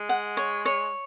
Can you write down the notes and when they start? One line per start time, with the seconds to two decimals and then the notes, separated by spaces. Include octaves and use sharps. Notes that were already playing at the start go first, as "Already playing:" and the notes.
Already playing: G#3
0.09 F#5
0.37 C#5
0.65 C#5